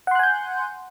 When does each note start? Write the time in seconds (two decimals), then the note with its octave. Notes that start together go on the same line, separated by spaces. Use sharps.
0.07 F#5
0.11 C6
0.15 F#6
0.19 G#5
0.23 G6